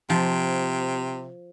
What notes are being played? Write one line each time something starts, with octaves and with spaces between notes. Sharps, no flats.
C3 F3